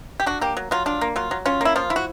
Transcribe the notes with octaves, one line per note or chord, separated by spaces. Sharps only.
G4
D4 F#4
A#3 G4
F#3
F#3 F4
D4 F4
A#3
F#3 F4
F#3
C#4 F4
A#3 E4
F3 F4
E4
F#4